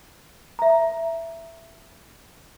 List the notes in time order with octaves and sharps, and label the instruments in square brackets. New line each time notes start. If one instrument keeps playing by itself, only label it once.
[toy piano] E5 A#5